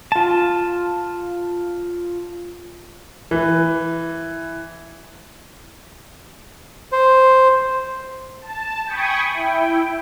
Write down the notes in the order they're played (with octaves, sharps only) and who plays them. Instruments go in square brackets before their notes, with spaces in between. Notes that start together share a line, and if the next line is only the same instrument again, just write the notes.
[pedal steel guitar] F4 A5
[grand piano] E3
[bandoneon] C5
[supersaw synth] A5
G5 G#5 B5 C#6 D#6
E4 G5